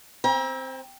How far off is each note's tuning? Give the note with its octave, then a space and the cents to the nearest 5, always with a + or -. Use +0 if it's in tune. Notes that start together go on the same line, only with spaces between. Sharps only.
C4 +0 G5 +40 A#5 +40